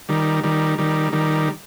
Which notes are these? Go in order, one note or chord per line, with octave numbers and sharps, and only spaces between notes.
D#3 G3
D#3 G3
D#3 G3
D#3 G3